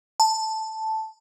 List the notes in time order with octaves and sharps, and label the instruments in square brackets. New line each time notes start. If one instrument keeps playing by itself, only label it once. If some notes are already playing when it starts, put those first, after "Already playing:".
[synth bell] A5